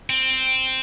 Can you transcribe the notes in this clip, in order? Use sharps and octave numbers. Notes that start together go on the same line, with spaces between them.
C4